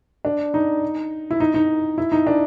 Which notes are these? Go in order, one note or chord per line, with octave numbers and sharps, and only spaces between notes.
D4
D#4
E4
D#4
D#4
E4
D#4
D4